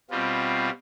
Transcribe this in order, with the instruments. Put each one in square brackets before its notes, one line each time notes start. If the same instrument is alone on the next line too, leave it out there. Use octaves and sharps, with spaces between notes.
[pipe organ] B2 G3 C4 F4